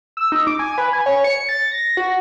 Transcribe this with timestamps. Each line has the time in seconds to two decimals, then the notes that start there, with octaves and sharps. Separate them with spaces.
0.17 E6
0.32 D#4
0.47 D6
0.59 G#5
0.78 B4
0.93 G#5
1.06 C#5
1.24 C#7
1.49 A6
1.72 A#6
1.97 F#4